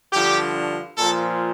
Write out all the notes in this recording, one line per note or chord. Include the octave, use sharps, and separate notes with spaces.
G2 D3 F3 G4
A#2 F3 A4